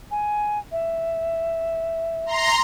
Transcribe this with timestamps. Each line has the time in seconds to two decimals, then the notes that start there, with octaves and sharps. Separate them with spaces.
0.11 G#5
0.72 E5
2.26 A#5 C6